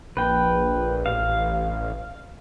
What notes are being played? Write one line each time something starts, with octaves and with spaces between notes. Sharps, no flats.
A#1 B4 G5
A1 F5